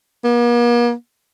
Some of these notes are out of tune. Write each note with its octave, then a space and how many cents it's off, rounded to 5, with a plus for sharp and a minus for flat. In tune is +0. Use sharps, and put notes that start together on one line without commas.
A#3 +45